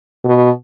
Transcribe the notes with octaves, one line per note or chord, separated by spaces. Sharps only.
B2